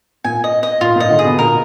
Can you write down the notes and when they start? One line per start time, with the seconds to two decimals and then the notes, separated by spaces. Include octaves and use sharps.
0.24 A#2 G#5
0.44 D#5
0.63 D#5
0.81 A#2 F4
0.96 A#2 D#5
1.10 D3
1.19 G#4
1.25 B2
1.39 A#2 A#4